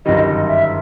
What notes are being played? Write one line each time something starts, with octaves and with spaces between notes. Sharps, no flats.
G1 F#2 D#3 G3 D#5
D#5
E5